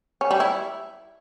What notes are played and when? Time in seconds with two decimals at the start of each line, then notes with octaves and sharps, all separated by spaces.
0.21 C#4
0.31 G3
0.40 E4